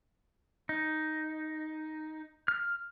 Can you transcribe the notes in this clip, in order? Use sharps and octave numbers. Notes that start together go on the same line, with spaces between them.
D#4
F6